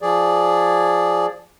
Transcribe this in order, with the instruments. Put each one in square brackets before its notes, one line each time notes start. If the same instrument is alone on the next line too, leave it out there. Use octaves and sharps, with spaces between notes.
[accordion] F3 G#4 D5